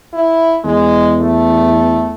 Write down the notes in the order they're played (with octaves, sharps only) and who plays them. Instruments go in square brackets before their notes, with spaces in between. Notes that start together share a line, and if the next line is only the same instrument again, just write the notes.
[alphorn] E4
[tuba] E2 [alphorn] G#3
[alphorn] A3